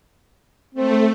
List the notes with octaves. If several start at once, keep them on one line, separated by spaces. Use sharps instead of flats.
A3 C4